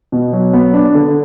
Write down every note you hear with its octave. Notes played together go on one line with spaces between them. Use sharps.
B2
F#3
B3
D4
D3